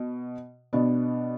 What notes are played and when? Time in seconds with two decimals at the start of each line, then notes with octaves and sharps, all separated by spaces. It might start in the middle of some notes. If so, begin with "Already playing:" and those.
Already playing: B2
0.73 B2 B3 D4